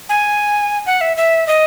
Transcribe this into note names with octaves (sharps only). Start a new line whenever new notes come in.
G#5
F#5
E5
E5
D#5